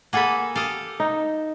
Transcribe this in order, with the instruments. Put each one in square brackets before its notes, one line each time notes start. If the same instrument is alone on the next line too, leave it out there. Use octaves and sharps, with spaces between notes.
[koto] A#3 G#4 A4 [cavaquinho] F#5 B5
[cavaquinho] G4 D#6 [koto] A4 F5
[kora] D#4